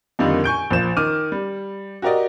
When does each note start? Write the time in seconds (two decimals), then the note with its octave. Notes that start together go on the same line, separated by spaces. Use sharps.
0.19 F2 D3 D#3 G3 A#3 D#4
0.44 G#5 C#6 G6 D7
0.70 A#1 F3 E7
0.97 D#3 D6 F6 D#7
1.32 G3
2.02 F#4 G4 A#4 D5 D#5